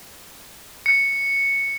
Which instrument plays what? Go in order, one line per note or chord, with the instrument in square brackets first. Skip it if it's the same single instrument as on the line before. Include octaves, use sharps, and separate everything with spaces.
[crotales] C#7